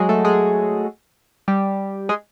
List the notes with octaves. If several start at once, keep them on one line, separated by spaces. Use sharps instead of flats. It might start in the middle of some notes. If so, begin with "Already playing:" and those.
Already playing: F#3 G#3 F#4 G#4
A3 A4
G#3 G#4
G3 G4
G#3 G#4